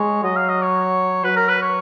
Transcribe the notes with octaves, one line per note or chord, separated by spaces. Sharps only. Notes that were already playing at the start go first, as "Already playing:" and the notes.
Already playing: G#3 C#5
F#3 D#5
F5
D#5
C#5
F#3 B4
A#4
B4
C#5